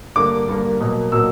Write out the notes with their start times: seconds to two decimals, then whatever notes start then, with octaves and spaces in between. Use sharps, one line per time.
0.16 G2 D3 A#3 D6
0.48 G2 D3 A#3
0.80 B2 F#3 A#3
1.12 B2 F#3 A#3 E6